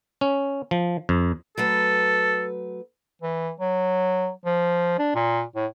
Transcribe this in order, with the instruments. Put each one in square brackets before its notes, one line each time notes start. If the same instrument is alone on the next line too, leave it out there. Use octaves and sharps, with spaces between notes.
[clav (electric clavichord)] C#4
F3
F2
[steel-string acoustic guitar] F#3 A3 B4 [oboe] A4
[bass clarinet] E3
F#3
F3
D4
A#2
A2